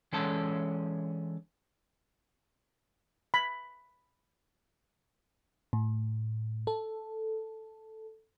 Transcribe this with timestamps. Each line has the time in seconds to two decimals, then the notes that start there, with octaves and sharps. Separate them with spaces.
0.13 E3 G#3 C#4 D4 A4 A5
3.34 B5
5.73 A2
6.67 A4